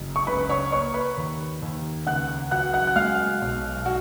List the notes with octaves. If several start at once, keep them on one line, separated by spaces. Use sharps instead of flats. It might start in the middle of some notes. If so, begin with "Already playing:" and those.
Already playing: F#1
C#6
C#2 B4 B5
C#5 C#6
A#3 C#5 C#6
B4 B5
D#2
D#2
C#2 F#5 F#6
F#3 F#5 F#6
F#5 F#6
F#6
G#3 F5 F6
B1
F#4